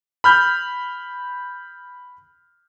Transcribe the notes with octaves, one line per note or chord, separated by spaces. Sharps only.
B5 F6 G6